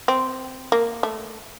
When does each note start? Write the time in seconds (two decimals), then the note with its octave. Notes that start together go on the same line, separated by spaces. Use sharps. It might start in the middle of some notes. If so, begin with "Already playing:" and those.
0.08 C4
0.72 A#3
1.03 A3